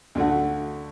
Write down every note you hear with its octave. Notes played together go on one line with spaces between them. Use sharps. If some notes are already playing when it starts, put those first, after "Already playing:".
D2 D3 A3 F#4